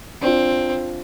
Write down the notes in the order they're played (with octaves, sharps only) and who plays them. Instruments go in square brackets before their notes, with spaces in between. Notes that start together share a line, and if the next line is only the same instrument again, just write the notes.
[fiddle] C4 [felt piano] D4 F4